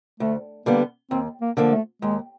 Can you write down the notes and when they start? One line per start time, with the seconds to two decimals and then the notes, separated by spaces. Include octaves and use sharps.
0.20 D2 A3
0.66 D3 G3 A#3 B3
1.10 D#2 C4
1.41 A#3
1.57 D3 F3 A#3
1.72 A3
2.02 D#2 G#3